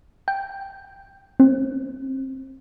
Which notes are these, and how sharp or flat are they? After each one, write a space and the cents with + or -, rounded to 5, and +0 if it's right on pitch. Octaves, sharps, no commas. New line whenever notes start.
G5 +0
C4 +25